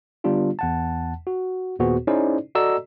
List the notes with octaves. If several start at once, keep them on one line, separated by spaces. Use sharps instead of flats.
D3 G3 B3 D4 F4 G4
E2 F#5 A5
F#4
D#2 A#2 B3 F#4 G#4 C5
C#4 D#4 E4 G#4 C5 D5
F#4 A4 D5 D#5 A#5 E6